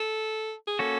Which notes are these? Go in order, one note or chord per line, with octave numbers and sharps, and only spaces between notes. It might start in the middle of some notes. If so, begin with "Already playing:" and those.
Already playing: A4
G#4
A#3 C#4 F#4 A4